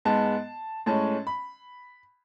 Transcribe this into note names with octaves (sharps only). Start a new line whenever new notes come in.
G#2 G#3 B3 A5
A2 G#3 C#4 A5
B5